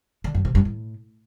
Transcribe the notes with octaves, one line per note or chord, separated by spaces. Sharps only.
D3
F#2
C3
G2
A2